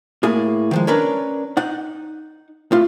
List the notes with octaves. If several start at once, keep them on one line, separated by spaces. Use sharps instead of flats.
A2 A#3 G#4
D#3 F3 G#3
C#4 D4 A#4 B4 C#5
D#4 F#5
A2 F4